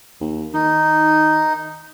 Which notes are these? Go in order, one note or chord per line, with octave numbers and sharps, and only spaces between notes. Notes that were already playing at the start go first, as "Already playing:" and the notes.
D#2
D#3 D#4